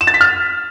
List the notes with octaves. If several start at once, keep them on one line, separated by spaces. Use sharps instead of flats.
E7
A6
B6
F6